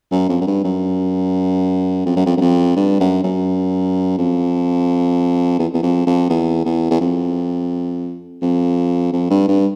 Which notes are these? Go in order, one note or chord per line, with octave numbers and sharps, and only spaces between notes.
F#2
F2
F#2
G2
F#2
F2
F#2
F2
F#2
F2
G2
F#2
F#2
F2
E2
E2
F2
F2
E2
E2
E2
F2
F2
F2
G2
G2